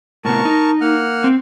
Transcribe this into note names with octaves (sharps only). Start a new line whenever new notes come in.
A2 C3 B3 A#4 A5 C#6
D#4
A#3 F#5 F6
C4